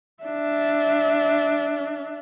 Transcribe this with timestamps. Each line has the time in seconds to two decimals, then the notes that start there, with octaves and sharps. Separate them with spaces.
0.23 D4 E5